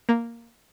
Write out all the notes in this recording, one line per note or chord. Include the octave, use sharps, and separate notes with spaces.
A#3